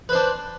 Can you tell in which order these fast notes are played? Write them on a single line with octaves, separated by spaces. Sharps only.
B4 C5 D4